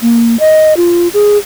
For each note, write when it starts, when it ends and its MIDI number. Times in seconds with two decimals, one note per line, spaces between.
0.02 0.36 58
0.40 0.73 75
0.77 1.08 65
1.14 1.37 68